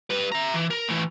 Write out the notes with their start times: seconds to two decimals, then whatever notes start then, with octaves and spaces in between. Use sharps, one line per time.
0.10 G3 B4
0.32 E5 A#5
0.54 E3
0.70 A#4
0.88 A2 E3